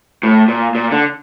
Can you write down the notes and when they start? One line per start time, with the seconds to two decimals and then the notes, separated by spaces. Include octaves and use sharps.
0.23 A2
0.48 A#2
0.75 A#2
0.91 D3